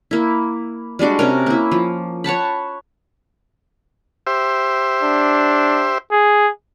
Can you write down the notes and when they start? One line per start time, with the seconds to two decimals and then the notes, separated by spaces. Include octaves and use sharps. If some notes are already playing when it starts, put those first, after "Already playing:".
0.11 A#3 E4
0.99 G3 G#3 D4 F#4
1.19 C3 C#4 A#4
1.46 A#3 E4
1.72 F3
2.24 C#5 F#5 A5 B5
4.27 G4 C5 E5
5.03 D4
6.11 G#4